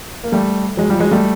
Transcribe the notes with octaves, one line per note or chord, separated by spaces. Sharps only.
A#3
G3 A3
F#3 G#3
F3 G3
F#3 G#3
G3 A3